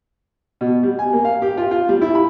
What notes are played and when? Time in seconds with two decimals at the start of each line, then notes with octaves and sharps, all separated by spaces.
0.61 B2
0.83 G3
0.99 G#5
1.13 A#3
1.25 F5
1.42 G4
1.57 F4
1.71 F4
1.89 G3
2.01 E4
2.15 B5